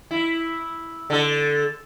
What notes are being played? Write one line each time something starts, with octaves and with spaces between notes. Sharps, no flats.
E4
D3 A4